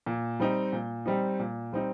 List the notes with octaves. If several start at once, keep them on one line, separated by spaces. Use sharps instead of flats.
A#2
G3 C4 D#4
A#2
G3 C4 D#4
A#2
G3 C4 D#4